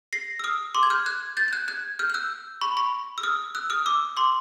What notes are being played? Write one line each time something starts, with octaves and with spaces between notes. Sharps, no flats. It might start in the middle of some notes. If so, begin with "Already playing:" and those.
A#6 C7
E6
D#6 F6
C6 D6
G#6
F6 G6
F#6 G#6
G6 A6
G6
F#6 G#6
F#6 G#6
F6 G6
G6
E6 F#6
B5 C#6
B5 C#6
E6
D#6 F6
E6 F#6
D#6 F6
D6 E6
C6 D6